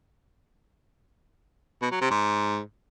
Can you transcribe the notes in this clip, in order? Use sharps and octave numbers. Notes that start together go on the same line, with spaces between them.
B2
F#3
C3
G#2